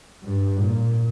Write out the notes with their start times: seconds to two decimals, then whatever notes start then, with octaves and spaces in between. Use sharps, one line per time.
0.24 G2
0.59 A#2